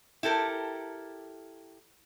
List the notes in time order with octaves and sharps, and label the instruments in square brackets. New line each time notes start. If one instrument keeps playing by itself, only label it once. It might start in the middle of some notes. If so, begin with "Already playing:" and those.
[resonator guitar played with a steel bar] E4 G4 A4 A#4